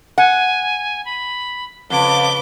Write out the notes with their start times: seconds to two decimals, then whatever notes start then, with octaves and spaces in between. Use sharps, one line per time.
0.18 F#5 G#5
1.05 B5
1.90 F2 C#3 B4 D6 G7